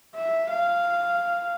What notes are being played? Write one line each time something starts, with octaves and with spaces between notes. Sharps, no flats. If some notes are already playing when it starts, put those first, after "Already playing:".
E5
F5